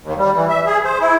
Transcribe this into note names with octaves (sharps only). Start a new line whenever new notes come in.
D#2
G3
E3
E5
G#4
C5
E4